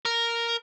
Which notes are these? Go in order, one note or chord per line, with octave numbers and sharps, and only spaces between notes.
A#4